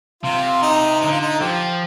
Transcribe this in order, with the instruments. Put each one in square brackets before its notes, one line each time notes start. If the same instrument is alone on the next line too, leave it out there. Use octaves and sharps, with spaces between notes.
[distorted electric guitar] C3 [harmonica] F4
[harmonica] D#4
[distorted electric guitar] D3 [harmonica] D#4
[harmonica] F4
D#4
[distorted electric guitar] F3 [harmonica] G4